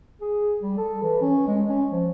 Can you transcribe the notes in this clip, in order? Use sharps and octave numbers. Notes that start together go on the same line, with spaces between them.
G#4
G3
A4
E3
C#4
G#3
C#4
F3